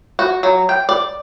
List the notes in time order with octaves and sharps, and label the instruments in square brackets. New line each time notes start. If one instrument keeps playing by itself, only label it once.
[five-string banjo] F#4
F#3
G5
D5